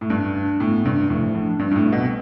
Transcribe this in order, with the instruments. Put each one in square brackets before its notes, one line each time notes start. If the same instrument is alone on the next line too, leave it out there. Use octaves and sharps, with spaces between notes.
[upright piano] A2
[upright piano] G2 [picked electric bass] D4
[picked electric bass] D4
[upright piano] A2 [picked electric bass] B3
[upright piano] G2 [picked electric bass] C3
[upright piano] A2 [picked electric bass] F3
[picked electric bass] D4
[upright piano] G2 [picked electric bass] G3
[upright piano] G2
A2
[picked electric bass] C4
[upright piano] B2